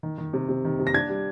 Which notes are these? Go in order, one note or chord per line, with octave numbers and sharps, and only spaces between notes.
D#3
D#3
C3
C3
D#3
C3
A#6
D4 G#6
G3